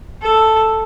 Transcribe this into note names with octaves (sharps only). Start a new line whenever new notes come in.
A4